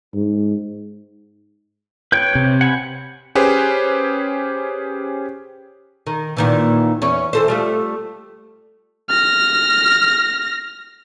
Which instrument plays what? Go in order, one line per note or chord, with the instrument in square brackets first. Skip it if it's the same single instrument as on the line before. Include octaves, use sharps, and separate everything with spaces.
[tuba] G#2
[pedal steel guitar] B4 C#5 G5 [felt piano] G6
[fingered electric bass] C3
[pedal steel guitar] F#5 G#5 B5
[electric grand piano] C#4 G4 G#4 B4 C5
[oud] D#3
A#2 D#3 E3
E2 C#4 C#5
E3 A4 C5
G3 A3 F4
[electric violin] F6 A#6